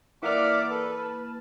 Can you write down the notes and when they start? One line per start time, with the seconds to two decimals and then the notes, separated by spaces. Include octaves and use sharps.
0.23 E3 A#3 A#4 D5 E5 F#5 D6 F6
0.70 A4 B4
1.02 A5